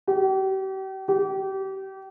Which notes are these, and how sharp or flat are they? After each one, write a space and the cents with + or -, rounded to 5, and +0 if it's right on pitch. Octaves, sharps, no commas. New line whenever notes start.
G4 -40
G4 -30